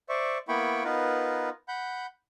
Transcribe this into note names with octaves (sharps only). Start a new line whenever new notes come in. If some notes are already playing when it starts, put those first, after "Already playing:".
C5 D5 E5 C#6
A#3 B3 E4 G5 B5 C#6
B3 D#4 F4 A#4 B4
F#5 B5 G6